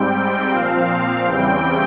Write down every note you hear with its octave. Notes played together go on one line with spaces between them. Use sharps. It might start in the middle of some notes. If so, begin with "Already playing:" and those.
Already playing: G#2 G3 C4 G5
A#2 F3 C4 F5
E2 C#3 E3 G3 C4 G5